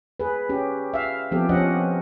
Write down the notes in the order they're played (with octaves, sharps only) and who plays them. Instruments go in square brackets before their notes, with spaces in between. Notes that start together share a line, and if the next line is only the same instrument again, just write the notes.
[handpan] G#4 B4
C#4 G4
E5 F5
F3 B3 C4 G4 A4
F3 C4 C#4 D#5 F#5